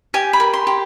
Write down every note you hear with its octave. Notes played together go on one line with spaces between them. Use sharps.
G4 G#5
B5
A#4
C6
G4